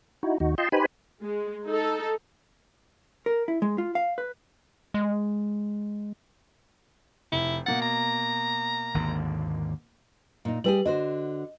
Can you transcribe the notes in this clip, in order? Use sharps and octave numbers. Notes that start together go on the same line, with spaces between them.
D#4 E4 F#4
D#2 D#4 F#4
F4 D#5 G5 A5 C6
D#4 G4 B4 C5 G#5 B5
G#3
D#4 A4
A#4
E4
G#3
F4
F5
B4
G#3
F1 E4
B2 A#3 F#5 A6
A#5
G#1 D#2 D3
A#2 D#4
G3 G4 G#4 B4 F#7
D3 F#4 C5 D#5